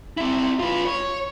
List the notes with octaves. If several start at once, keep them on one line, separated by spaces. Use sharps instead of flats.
C4 E4
F4 B4
C#5